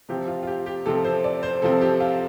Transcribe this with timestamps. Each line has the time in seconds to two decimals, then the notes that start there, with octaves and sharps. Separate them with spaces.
0.09 C3 F3 C4 G4
0.28 F4
0.43 F4
0.47 G4
0.66 G4
0.86 C3 F3 C4 A4
1.04 C5
1.24 D5
1.43 C5
1.62 C3 F3 C4 A4
1.81 G4
2.00 F4